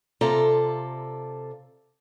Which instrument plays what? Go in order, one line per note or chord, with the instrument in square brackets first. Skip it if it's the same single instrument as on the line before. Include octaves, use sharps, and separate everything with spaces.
[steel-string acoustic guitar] C3 F4 A4 D5 A#5